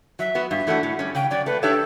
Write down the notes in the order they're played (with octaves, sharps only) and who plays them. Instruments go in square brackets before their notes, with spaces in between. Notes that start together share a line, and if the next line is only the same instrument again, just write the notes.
[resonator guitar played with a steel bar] F#3 [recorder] E5
[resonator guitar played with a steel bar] B3 F#4
[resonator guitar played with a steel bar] G2 [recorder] E5
[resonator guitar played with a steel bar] E3 A3 D4 F#4
A2
G3 C#4
[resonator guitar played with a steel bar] C#3 [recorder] G5
[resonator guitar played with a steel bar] F#3 C#4 [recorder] D5
[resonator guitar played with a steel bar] A3 [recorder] B4
[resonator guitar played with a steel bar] D4 G4 C#5 E5 [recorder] A4